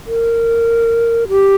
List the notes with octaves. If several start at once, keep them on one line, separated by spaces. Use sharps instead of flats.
A#4
G4